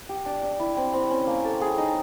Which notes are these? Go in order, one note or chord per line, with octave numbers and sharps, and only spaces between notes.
G4
D4
D4
E4
C4
C4
C#4
A#3
A4
G#4
D#4